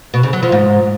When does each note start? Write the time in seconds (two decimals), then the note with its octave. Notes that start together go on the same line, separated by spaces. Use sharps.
0.14 B2
0.23 C#3
0.33 F#3
0.43 F3
0.52 G#2